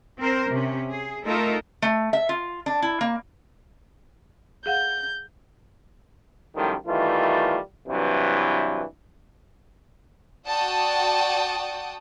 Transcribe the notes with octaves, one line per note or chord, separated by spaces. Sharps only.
C4 A#4 C5
C3 C#4
G#4
A3 D#4 F4 A4 A#4
A3
E5
F4
D4
E4
A#3
G#4 F5 F#5 G6
F#2 A2 D#3 F3 G3
D#3 E3 G3 A3 F4
G2 C3 E3 F#3
F#4 D5 F#5 G5 A5 D#6